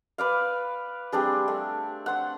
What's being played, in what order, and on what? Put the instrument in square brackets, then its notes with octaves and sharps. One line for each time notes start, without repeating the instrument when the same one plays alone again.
[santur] B4 D5 F5
G3 C4 D4 G#4
A3
D4 C5 F#5